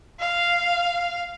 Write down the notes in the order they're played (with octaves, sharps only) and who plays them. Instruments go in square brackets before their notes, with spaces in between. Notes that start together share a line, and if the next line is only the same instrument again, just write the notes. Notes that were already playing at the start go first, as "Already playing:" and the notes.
[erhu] F5